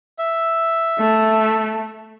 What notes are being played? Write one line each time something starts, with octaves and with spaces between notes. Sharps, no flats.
E5
A3